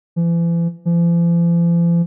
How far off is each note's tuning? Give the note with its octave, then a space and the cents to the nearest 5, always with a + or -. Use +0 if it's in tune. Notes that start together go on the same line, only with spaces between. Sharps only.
E3 +40
F3 -45